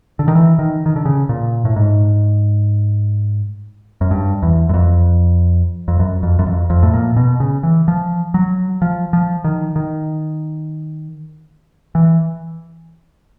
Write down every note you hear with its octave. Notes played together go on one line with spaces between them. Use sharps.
D3
D#3
E3
D#3
D#3
D3
C#3
A#2
A2
G#2
F#2
G2
E2
F#2
F2
F2
F#2
F2
F#2
F2
F2
A2
A#2
B2
C#3
E3
F3
F#3
F3
F3
D#3
D#3
E3